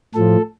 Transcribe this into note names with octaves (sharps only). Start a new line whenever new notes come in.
A2 F3 A4